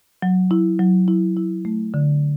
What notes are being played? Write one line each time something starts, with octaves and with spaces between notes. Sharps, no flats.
F#3
E4
F#3
E4
E4
A3
D3